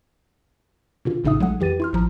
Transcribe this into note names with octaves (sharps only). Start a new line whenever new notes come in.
B2 D3 F4
A#1 A2 C#3 D#4 E5 D#6
A#1 F#3 G#3 A3 F#5 D#6
F2 E3 G4 B4 A6 D#7
E4 C6 F6
A1 F3 A#5